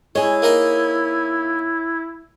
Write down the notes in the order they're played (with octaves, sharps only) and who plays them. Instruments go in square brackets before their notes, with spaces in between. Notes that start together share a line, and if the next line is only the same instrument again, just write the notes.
[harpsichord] G#3 [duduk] E4 [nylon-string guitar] G#4 C#5
[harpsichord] A#3 D#4 D#5